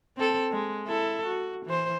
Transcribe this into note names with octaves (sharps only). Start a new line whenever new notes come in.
C4 A4
G#3
E4 A4
F#4
E3 C5